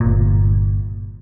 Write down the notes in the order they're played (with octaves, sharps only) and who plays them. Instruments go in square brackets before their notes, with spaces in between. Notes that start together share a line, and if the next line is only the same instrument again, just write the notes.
[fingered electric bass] G1 A#2